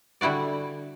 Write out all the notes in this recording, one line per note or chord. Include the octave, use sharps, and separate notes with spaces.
D3 G3 E4 F#4 D5